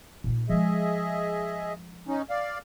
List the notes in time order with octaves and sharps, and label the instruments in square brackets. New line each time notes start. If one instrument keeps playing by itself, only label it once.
[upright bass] A#2 D#4
[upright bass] F3 G#3 [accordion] G#4 D#5 E5
[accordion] C#4 D#4
D5 F5